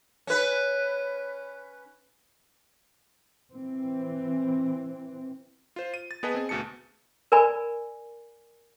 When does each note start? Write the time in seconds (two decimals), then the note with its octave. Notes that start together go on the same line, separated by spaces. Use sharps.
0.27 C#4 B4
3.52 E3 C4
5.76 F4 C5
5.94 D#7
6.11 A6
6.23 B3 G#4 B4 D#5 A5
6.35 C4 G#4
6.49 D2 B2 A5 C#7
7.32 A#4 D5 G#5 B5